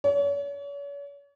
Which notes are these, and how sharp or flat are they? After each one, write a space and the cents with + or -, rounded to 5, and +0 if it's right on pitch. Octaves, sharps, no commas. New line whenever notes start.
C#5 +40